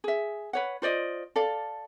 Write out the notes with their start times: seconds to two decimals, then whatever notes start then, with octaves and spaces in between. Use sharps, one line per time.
0.04 G#4 E5
0.53 B4 C#5 F#5
0.82 F4 C5 D5 D#5
1.36 A4 D5 F5